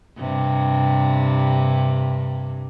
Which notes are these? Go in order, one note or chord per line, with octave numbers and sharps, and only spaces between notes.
G2 C3